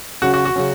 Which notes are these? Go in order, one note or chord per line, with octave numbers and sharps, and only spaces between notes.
C#3 F#3 C#4 F#4
F#4
F#4
C#3 F#3 C#4